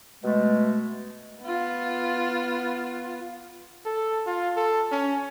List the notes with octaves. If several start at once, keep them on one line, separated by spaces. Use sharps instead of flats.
B2 G#3 A3
B3 F4
A4
F4
A4
C#4